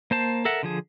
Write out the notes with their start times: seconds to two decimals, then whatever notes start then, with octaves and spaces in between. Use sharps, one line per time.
0.11 A#3 C5 A5
0.45 A4 A#4 E5 F#5
0.63 D3 F3 G#4